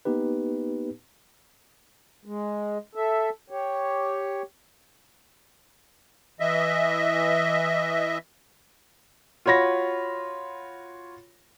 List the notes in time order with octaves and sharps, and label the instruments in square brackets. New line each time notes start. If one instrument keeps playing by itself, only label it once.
[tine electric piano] A#3 B3 D#4 G4 B4
[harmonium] G#3
A4 E5
G4 C#5
[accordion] E3 D#5 E5
[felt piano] F4 F#4 C#5 B5 A#6